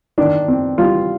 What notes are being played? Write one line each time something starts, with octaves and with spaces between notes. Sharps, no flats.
D#3 D4
C4
G3 F4